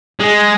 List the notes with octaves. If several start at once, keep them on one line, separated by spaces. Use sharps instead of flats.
G#3